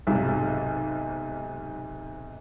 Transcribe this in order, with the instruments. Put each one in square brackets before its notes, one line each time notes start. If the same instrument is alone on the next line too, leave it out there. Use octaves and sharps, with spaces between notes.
[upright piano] B1 G#2 C3